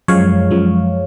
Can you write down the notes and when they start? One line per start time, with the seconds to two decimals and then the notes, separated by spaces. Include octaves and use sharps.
0.08 F#2 F3 G#3 C#5 F5
0.51 F#2 F3 G#3